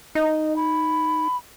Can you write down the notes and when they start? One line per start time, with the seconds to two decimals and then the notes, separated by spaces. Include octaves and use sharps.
0.15 D#4 D#5
0.56 B5